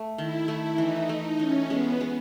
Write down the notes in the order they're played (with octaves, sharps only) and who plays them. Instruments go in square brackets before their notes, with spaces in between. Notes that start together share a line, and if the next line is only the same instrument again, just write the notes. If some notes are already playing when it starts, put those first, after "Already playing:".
Already playing: [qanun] A3
[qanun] D#3 [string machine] E4
[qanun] A3
[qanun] E3 [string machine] D#4
[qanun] A3
[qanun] E3 [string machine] C#4
[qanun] G#3 [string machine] B3
[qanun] G#3